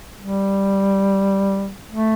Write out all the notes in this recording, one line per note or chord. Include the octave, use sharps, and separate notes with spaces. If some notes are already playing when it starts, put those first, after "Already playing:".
G3
A3